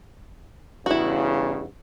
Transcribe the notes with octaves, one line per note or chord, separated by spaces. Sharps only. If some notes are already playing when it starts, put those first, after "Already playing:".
E2 G2 C#3 E4 F#4